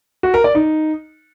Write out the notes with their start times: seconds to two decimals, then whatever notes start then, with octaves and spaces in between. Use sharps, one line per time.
0.23 F#4
0.34 A#4
0.44 D5
0.55 D#4